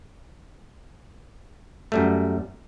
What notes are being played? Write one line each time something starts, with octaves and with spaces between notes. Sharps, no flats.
F#2 G3 A3